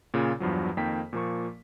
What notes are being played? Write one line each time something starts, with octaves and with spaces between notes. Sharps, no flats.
A#2 C#3 F4
E2 G2 F3 F#3
F2 D#3 A#3 G5 B6
A#2 F3 A#3 C#6